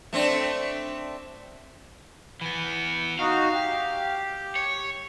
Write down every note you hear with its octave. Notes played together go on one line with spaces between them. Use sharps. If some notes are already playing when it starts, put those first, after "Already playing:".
A3 C4 D4
E3 B3
D#4 F#4 F5
G4
C#5